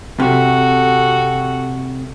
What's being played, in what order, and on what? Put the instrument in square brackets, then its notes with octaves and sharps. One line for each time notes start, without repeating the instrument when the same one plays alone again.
[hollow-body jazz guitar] C3 [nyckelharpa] F#4 A4